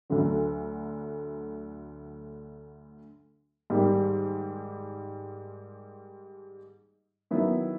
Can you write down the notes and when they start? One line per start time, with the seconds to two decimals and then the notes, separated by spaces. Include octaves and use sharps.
0.10 D2 D3 F#3
3.70 G#2 D#3 G3 A#3
7.31 D#3 F#3 B3 E4